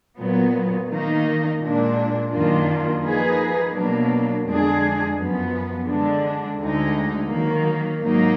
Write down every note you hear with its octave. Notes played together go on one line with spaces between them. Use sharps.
A#2 F#3 B3
D#3 A#3 D#4
A#2 G#3 D4
F#2 D#3 A#3 D4 F4
F3 A#3 D#4 G#4 B4
B2 F#3 A#3 D4
F2 D3 G#3 D4 G#4
F#2 F3 B3
D3 G#3 D4
D2 D3 G#3 D#4
D#3 F#3 A#3
G#2 F#3 A#3 D#4